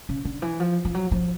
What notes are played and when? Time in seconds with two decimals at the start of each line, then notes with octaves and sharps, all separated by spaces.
0.09 C#3
0.25 D3
0.42 E3
0.60 F3
0.85 F3
0.94 F#3
1.11 F3